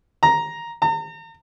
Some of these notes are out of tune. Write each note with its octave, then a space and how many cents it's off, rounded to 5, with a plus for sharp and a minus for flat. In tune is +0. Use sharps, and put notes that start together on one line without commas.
A#5 +5
A#5 -40